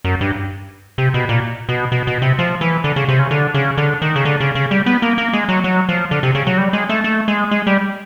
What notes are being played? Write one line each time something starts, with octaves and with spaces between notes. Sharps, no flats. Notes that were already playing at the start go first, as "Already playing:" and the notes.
F#2
G2
C3
B2
A#2
B2
B2
B2
C3
F3
E3
D3
C#3
C3
C#3
D3
C#3
D3
D#3
C#3
D3
C#3
C#3
G3
B3
A#3
A#3
G#3
F#3
F#3
F3
D3
C3
C#3
F#3
G3
G#3
A3
A3
G#3
G#3
G3